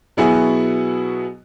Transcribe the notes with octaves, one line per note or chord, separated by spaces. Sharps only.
B2 F#3 B3 E4 F#4 G#4